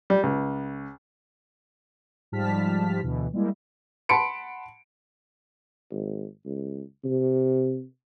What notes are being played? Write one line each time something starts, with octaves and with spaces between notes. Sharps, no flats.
G3
C#2
G#2 F3 G3 A5 F6 B6
D2 B2 E3
G3 G#3 A#3 E4
F#5 A5 B5 C6 C#7 D7
G#1
C#2
C3